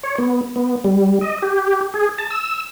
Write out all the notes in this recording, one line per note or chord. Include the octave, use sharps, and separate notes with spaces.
C#5
B3
B3
G3
D#5
G4
G#4
A5
E6